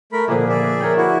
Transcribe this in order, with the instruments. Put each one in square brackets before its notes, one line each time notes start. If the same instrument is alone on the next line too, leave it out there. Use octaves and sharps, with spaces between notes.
[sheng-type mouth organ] A3 A#4 B5
[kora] A#2 D3 F3 [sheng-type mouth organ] G#4
[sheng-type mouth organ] G#4 D5 E5
[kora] B4
A#4 C#5 G5
[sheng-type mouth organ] E4 F#4